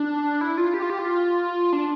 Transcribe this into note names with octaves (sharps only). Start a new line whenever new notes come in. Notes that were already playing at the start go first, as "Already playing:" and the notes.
Already playing: D4
E4
F4
G4
F4
G4
F4
D4